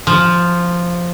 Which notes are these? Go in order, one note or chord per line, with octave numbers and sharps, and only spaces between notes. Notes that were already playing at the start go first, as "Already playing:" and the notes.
F3